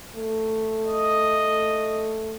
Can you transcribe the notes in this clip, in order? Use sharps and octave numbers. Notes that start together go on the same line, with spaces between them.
A3
D#5